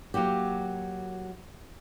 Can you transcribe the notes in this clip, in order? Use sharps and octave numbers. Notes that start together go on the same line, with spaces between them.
F#3 A#3 F#4 G4